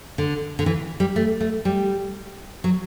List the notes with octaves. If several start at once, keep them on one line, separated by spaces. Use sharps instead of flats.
D3
D3
E3
G3
A3
A3
G3
F#3